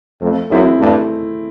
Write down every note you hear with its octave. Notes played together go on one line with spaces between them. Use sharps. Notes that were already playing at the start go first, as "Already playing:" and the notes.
F2 A3
F#2 C4 E4 G#4
G2 A3